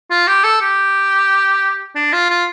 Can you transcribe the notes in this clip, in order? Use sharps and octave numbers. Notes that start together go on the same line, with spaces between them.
F4
G4
A4
G4
D4
F4
F4